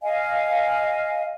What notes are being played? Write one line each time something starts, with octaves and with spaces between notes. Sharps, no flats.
D#5 F5 G#5